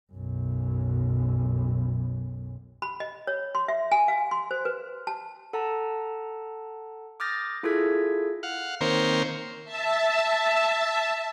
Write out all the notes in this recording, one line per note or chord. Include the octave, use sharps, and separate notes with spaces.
B1 F#2
B5
D#5
C#5
C6
E5
G#5
F5
C6
C5
B4
A5
A4 F#5 A5 A#5
D6 D#6 F6 G6 A6 A#6
E4 F4 G#4 A4 G#6 B6
F5 F#5
D#3 A#3 C4 A#4 C5 C#5
E5 A5